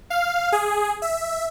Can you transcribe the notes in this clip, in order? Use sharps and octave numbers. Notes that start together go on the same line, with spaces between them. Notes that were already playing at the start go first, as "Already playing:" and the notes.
F5
G#4
E5